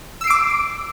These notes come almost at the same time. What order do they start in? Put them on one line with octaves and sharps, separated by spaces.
E6 C7 D7 D6